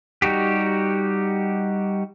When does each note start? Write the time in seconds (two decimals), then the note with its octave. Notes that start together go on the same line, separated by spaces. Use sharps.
0.22 G3 D#4 F#4 G4